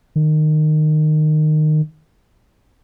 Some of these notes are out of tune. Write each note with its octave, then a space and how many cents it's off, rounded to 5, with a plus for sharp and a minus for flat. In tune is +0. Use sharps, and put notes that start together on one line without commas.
D#3 -20